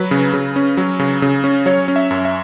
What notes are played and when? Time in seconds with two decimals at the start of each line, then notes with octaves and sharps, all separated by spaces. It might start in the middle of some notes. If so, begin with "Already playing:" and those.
Already playing: F#3 B4
0.11 C#3
0.33 C#3
0.56 C#4
0.77 F#3
0.99 C#3
1.22 C#3
1.44 C#4
1.66 F#3 C#5
1.88 C#4
1.96 E5
2.11 F#2
2.25 E5